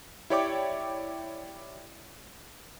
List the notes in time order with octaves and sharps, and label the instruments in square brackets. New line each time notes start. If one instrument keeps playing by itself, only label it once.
[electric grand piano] E4 G4 C#5 D5 G5 D6